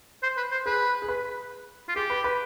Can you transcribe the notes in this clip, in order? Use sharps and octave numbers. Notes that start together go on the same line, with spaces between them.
C5
B4
C5
G#4 B4
G#4
B4
F4
G4 G#4
B4
B4